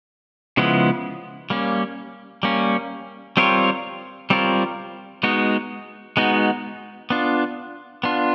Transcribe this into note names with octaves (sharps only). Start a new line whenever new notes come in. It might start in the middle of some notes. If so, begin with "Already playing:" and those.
C#3 F3 G#3 B3 E4
G3 A#3 C#4
G3 A#3 C#4
G3 C4 F4 A#4 C#5
G3 C4 F4 A#4 C#5
G#3 B3 D#4 F#4
G#3 B3 D#4 F#4
B3 D4 F4
B3 D4 F4